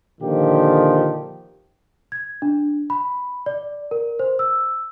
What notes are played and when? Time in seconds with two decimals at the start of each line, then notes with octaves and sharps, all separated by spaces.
0.21 A#2 D3 D#3 F3 G4
2.12 G#6
2.42 D4
2.90 B5
3.46 D5
3.91 A#4
4.19 C5
4.39 E6